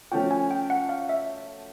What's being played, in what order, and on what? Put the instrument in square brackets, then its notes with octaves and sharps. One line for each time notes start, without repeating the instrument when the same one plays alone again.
[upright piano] F3 A3 C#4 F#4 [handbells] G5
[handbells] G#5
G5
F#5
F5
E5